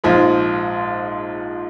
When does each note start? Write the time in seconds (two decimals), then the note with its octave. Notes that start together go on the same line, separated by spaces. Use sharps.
0.04 A#1 G#2 F3 G#3